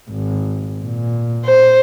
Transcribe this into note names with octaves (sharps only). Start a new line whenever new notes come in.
G#1
A#2
C5